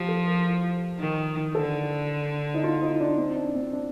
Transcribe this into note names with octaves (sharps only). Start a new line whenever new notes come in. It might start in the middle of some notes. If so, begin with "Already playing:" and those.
Already playing: F3 G4
A4
A#4
D#3
D3 A4
D#4
F4
D#4
D4
C4
D4
C4
D4